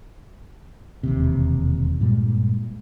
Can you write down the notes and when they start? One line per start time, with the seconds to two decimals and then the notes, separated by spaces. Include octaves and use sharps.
1.03 E1 D#2 C3
2.00 G2 A#2 G3 G#3